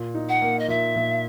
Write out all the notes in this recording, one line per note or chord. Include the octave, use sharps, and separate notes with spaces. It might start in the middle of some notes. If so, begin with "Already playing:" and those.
Already playing: A#2
D#4
F#5
A#3
D#5
A#2 E5
A#2